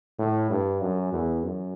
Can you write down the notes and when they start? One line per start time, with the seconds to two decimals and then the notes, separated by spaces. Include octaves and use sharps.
0.19 A2
0.50 G2
0.81 F#2
1.13 E2
1.43 F#2